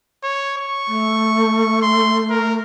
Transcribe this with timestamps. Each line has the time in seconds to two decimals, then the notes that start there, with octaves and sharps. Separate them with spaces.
0.24 C#5
0.57 C#6
0.88 A3
1.82 C6
2.30 A#4